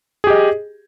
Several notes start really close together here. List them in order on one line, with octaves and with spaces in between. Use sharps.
G#4 G4 D#5